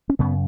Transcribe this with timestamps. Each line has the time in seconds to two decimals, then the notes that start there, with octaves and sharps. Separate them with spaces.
0.09 C#4
0.19 F#2 C#3 B3